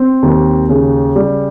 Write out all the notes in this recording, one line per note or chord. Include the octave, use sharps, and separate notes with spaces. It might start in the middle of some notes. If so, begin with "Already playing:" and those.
Already playing: C4
D#2
C#3
G3